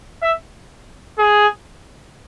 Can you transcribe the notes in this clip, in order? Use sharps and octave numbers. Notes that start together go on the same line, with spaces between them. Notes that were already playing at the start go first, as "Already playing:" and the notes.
E5
G#4